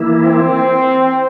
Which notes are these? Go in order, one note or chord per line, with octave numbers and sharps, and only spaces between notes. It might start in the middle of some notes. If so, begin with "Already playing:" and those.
Already playing: E3 A#3 E4
C4